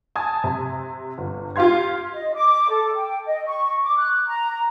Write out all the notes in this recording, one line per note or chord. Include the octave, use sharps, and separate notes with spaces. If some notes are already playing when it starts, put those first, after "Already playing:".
G#5 A5 D#6 G#6
C3
G1
F4 G4 F5 C6 G#6
D#5
D6
A4
G5
D#5
C#6
D6
F#6
A#5